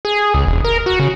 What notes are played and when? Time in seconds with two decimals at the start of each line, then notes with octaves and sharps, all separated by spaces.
0.05 G#4
0.34 C#2
0.47 E1
0.65 A#4
0.86 F#4
0.99 C#3